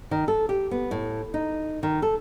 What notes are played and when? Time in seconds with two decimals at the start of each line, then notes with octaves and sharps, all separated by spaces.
0.11 D#3
0.28 A4
0.49 G4
0.71 B3
0.91 A2
1.34 D#4
1.83 D#3
2.02 A4